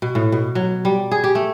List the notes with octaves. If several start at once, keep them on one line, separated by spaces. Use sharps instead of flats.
B2
A2
B2
F#3
G3
G#4
G4
A3